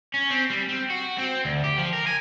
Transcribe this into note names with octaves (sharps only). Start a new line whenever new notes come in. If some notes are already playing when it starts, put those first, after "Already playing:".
C#4
C4
G3
C4
F#4
C4
D2
G4
F3
A#4
G#5